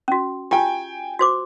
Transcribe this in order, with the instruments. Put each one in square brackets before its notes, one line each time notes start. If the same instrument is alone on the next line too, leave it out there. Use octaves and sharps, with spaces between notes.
[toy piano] C#4 F#4
[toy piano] F4 G4 [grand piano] G5 G#5
[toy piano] F#4 C5 D6